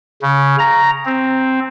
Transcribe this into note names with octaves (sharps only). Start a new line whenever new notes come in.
C#3
A#5
C4